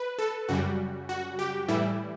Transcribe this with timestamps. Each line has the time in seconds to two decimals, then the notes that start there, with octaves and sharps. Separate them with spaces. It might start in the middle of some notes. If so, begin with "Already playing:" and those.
Already playing: B4
0.19 A4
0.49 F#2 C#3 G3 F#4
1.09 F#4
1.39 G4
1.68 A2 E3 G3 E4